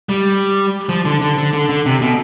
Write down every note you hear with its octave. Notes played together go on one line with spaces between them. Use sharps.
G3
F3
D3
D3
D3
D3
D3
C3
B2